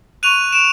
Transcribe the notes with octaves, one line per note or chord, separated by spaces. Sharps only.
C#6 F#6 D#7 F7
D7 E7